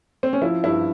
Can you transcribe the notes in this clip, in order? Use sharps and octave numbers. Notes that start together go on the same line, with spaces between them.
C4
C#4
F3 E4
G2 E4